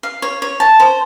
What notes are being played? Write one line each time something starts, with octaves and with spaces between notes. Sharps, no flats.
F5
C#5
C#5
A5
C5